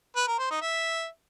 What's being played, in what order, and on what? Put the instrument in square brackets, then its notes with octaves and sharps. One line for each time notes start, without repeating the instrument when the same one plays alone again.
[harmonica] B4
A#4
C5
D#4
E5